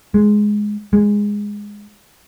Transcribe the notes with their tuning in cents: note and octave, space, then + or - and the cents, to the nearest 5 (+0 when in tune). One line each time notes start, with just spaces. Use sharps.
G#3 +5
G#3 -10